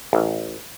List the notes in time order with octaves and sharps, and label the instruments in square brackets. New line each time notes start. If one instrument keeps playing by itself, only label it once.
[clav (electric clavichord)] A1